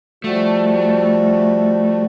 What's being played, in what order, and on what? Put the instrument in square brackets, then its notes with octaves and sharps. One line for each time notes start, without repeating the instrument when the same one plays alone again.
[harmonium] F3 G3 F#4 [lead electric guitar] A3